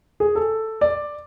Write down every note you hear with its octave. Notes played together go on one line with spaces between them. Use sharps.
G#4
A4
D5